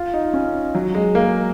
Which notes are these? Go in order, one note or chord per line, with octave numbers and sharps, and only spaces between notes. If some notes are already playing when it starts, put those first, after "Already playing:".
Already playing: F4
D#4
C#4
F#3
G#3
A#3
G#3